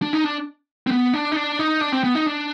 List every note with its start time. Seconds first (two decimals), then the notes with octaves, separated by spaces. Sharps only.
0.02 D4
0.13 D#4
0.24 D4
0.87 C4
0.91 B3
1.14 D4
1.32 D#4
1.36 D4
1.59 D#4
1.81 D4
1.92 C4
2.04 B3
2.15 D#4
2.26 D4